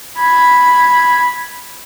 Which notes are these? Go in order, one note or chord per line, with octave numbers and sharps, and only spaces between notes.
B5 G#6